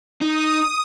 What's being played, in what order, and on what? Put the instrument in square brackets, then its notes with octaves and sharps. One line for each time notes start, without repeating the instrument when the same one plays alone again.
[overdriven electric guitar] D#4 [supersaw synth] D#6